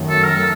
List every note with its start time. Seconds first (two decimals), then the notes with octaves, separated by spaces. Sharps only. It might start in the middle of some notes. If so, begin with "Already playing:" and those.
Already playing: F#2 D#3 F#3 A3
0.09 A4
0.24 A#4
0.36 A4